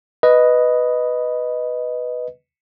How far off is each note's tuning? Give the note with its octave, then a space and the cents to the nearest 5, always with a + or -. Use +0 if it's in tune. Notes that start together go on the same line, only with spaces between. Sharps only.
B4 +0 D#5 +0